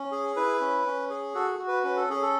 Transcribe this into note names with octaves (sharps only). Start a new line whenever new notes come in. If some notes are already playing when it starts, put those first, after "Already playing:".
Already playing: C#4
G#4
E4 B4
C#4
C#4
G#4
F#4 A4
F#4
B4
C#4 B4
A4
C#4 G#4
A4